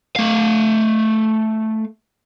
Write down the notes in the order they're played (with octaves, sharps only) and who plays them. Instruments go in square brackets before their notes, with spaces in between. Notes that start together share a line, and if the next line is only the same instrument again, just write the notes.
[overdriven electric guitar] A3 F5